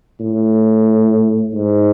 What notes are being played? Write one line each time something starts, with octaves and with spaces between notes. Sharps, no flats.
A2
G#2